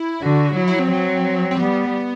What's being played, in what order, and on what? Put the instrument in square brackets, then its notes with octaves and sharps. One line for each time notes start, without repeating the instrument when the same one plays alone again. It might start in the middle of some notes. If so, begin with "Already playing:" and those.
Already playing: [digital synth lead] E4
[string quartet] D3 [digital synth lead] F#4
[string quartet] F#3 [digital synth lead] E4
[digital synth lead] E4
C4
[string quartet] F#3
[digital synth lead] C4
[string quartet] G3 [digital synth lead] B3